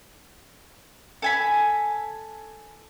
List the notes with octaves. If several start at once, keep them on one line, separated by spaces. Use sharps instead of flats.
A4 G#5 B5